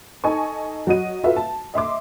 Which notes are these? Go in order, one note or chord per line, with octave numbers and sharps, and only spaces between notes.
D#4 A4 D#5 G#5 A5 C#6
F#3 F#4 D#5 D#7
F4 F#4 A4 B4 E5 F5
A5
D#5 E5 C6 D6